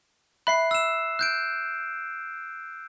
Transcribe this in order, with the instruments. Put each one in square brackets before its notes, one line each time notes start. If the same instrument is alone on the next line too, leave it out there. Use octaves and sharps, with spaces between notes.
[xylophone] E5 B5 [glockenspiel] F#6 C7
[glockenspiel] E6 E7
F#6 G6 D7